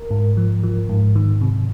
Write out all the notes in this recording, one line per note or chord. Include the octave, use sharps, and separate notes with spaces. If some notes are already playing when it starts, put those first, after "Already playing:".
Already playing: A#4
G#2
F3
F3
G#2
D#3
C3